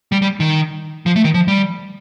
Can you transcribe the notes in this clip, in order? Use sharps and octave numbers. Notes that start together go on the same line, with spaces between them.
G3
G3
D#3
F3
A3
D#3
F3
G3